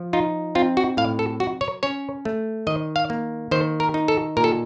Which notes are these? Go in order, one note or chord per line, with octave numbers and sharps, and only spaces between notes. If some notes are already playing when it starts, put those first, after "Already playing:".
Already playing: F3
D#4 F4
C4 F4
F#4
A2 F5
A4
F#3 F#4
C#5
C#4 C#5
A3
D#3 D#5
F5
A#3
D#3 C5
A#4
D#4
A4
A#2 A#4
A4